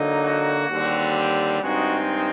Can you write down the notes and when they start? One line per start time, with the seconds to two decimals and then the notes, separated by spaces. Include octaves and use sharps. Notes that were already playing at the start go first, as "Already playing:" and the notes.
Already playing: D3 F#3 A#3 D#4
0.21 F#4
0.69 D#2 D3 G3 C4
1.62 G2 D#3 G#3 C4 D#4 F#4